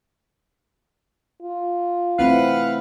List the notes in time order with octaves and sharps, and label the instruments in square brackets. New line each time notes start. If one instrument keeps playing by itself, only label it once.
[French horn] F4
[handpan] A3 C4 E4 [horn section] B4 F5 F#5